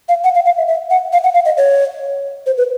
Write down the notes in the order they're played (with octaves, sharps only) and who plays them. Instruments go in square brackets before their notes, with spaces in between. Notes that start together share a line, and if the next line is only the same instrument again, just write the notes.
[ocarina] F5
F#5
F5
F5
E5
E5
F#5
F5
F#5
F5
D#5
C#5
C5
B4